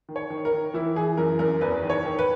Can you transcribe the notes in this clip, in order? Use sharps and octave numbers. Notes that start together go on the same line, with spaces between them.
D#3
C#5
D#3
A#4
D#3
E3 E4
E3 G#4
F#2 A#4
F#2 A#4
E2 B4
D#3
C#5
D#3
B4